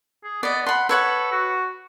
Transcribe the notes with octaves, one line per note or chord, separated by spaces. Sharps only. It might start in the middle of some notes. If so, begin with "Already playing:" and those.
G#4
B3 D5 D#5
F#5 B5 C6
A4 B4 C#5 F#5
F#4